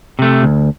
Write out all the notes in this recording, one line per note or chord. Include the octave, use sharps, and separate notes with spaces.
C3 A3
D2